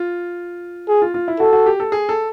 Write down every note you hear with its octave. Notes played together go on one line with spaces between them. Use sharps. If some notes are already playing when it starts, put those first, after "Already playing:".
Already playing: F4
G#4
F4
F4
E4
F#4 A4
F#4
G4
A4
G#4
A4